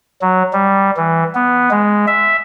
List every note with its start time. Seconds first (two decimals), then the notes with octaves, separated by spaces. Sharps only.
0.22 F#3
0.53 G3
0.97 E3
1.35 B3
1.71 G#3
2.07 E5